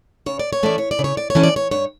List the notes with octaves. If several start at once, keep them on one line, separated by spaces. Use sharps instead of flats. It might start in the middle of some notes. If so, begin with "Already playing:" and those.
C#3 C#5
D5
C#5
E3 A3 C#4 D5
C#5
D5
C#3
C#5
D5
C#5
E3 A3 C#4
D5
C#5
G2 C#5